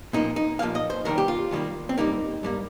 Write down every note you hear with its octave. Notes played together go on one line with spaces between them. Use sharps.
A#2 F3 A#3 D#4
D#4
A#2 F3 A#3 F5
D#5
C5
D#2 D#3 G3 A#3 A#4
G4
F4
D#2 D#3 G3 A#3
C4
G2 G3 A#3 D#4
G2 G3 A#3